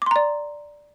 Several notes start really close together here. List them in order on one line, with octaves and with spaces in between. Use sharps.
D6 C6 A#5 D5